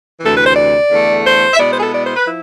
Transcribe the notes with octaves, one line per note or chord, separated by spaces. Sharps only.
D2 C3 E3 A4
B4
C5
D5
E2 D3 A3
C5
E5
B2 G#3 B3 E4 D5
C5
G#4
A4
D5
C5
B4
F3 E4